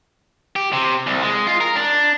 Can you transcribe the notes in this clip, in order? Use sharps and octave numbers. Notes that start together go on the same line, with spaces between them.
G4
C3
C2
G#3
F4
A#4
D4